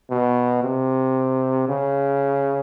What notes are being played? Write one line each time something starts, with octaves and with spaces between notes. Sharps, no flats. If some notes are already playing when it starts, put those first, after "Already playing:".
B2
C3
C#3